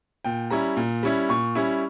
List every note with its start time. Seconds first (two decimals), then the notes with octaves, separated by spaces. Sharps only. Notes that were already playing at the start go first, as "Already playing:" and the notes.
0.25 A#2 G5
0.50 G3 C#4 E4 A#5
0.77 A#2
1.03 G3 C#4 E4
1.29 A#2 C#6
1.55 G3 C#4 E4